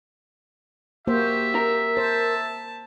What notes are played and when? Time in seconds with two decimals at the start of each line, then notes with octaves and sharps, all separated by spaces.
1.07 A#3 F#4 G4 C5 E5
1.55 A#4
1.97 C5 A5